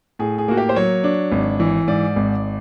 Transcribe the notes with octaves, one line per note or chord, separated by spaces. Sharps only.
A2 G#4
G#4
A#3 F#4
G4
C5
F#3 C#5
D4
G#1
E3
G#2 D5
G#1